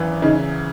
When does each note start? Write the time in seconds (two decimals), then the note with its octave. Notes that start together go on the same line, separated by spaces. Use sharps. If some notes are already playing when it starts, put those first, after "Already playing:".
Already playing: G#1 F#2 E3
0.22 C#3 D#4